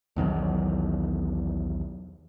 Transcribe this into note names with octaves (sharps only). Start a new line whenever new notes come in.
B1 E2 D#3 F#3